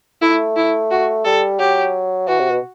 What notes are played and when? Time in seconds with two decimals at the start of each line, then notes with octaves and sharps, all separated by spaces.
0.21 A3 E4
0.56 E4
0.91 F#4
1.25 G3 A4
1.59 F#3 G4
2.28 E3 F#4
2.39 C3
2.51 B2